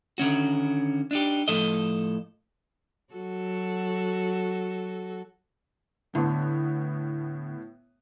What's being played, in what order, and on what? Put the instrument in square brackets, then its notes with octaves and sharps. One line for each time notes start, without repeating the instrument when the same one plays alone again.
[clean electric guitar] D3 D#3 C#4 F#4
D4 D#4 G4
A2 F3 A4 D#5
[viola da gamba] F#3 F#4 A4
[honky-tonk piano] A2 B3 [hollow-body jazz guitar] D3